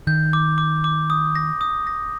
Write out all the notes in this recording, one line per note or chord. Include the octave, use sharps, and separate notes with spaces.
D#3 G6
D6
D6
D6
D#6
A#6
D#6
A#6